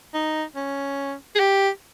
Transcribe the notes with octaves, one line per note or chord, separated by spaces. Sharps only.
D#4
C#4
G#4
G4